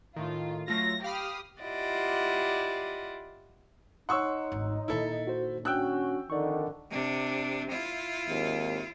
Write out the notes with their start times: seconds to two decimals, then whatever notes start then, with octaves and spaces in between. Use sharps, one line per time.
0.16 A2 D#3 F4
0.68 F#3 A3 F4 A#6
1.04 G4 F5 B5 D#6 F6
1.62 E4 F4 G4 D5 D#5 F#5
4.09 D#4 C#5 F#5 C6 C#6 E6
4.52 G#1 D2
4.88 A#2 D#3 E4 A4
5.27 F#4 C5
5.65 C#4 D4 F#4 G5 E6 F#6
6.30 F2 D3 D#3 D5 C#6
6.91 C3 D4
7.70 E4 F4
8.27 G#1 D#2